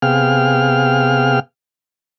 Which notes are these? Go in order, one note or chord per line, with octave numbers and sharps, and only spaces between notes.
C3 B3 G#4 F5 G5 F6